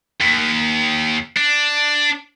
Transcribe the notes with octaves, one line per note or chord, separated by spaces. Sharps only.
D#2
D4